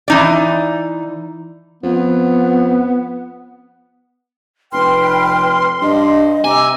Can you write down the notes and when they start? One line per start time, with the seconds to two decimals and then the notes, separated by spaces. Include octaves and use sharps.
0.08 E3 D#4 D5
1.83 F2 B3
4.72 F1 B4 G5 C6 F6
5.82 G2 D#5
6.45 C3 G#5 A#5 D6 E6